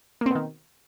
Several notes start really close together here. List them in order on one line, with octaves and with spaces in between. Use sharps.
A#3 C4 B2 D#3